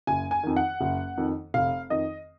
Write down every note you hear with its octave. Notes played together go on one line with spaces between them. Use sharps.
F#1 G#5
G#5
F2 D#3
F#5
F#1
F2 D#3
F1 F5
F2 D#3 D#5